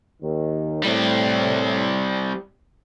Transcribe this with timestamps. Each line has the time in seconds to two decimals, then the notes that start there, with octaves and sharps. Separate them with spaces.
0.21 D#2 D#3
0.83 A2 G3 C4